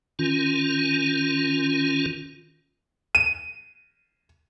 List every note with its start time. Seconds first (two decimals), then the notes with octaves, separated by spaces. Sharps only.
0.19 D#3 C#4 F4
3.15 D#7